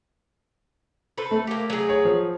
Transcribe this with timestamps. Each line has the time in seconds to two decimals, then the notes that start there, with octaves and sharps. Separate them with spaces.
1.18 A4 B4 C5
1.31 A3
1.47 A#3 G4
1.70 F#3 G#4
1.89 C#5
2.05 F3